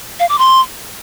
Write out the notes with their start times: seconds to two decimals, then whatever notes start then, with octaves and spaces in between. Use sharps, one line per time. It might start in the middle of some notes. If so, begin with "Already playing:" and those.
0.20 F5
0.29 D6
0.39 C6